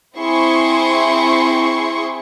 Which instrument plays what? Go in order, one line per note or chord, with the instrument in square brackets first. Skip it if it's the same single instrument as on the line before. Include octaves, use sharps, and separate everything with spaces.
[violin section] C4 E4 G#4 C6 C#6